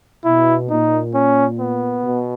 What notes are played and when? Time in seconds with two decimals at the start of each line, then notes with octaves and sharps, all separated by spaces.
0.25 B2 E4
0.70 A#2 D#4
1.14 C#4
1.59 B3
2.05 B2